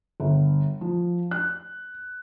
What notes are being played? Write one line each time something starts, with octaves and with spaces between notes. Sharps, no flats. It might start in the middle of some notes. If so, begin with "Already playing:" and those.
G1
F3
F#6